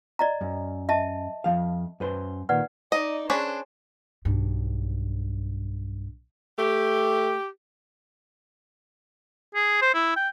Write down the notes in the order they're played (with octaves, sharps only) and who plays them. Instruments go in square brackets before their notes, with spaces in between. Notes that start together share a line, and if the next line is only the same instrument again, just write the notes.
[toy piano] D5 D#5 A#5
[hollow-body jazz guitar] F#2
[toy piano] D#5 E5 A5
[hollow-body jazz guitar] F2 F3 F5
F#2 B4 C5
[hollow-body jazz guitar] A#2 D#3 [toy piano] B4 D5 F#5
[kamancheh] D#4 D5 [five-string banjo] D#5
[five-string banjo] C#4 D4 B4 [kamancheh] G#4 C5
[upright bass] B1 G2
[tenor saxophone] A3 [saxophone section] G4
[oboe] G#4
C5
E4
G5